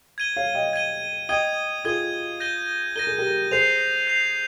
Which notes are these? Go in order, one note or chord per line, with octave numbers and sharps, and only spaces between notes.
G#6 D#7 G7
C#5 F5
D#5 G5
G#6 D#7 G7
D#5 G5 D#6 G#6 D#7 G7
F4 G#4 D#6 G#6 D#7 G7
G6 A#6 D#7 G7
A#4 G6 A#6 D#7 G7
G#4
G4 A#4
G#4 C5 G6 C7 F7
G6 C7 F7